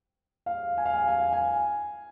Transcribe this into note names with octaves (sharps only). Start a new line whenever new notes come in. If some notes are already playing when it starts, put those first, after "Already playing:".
F5
G#5
F5
G#5
G#5
F5
G#5